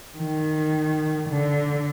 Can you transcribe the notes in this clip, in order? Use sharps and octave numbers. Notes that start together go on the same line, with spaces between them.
D#3
D3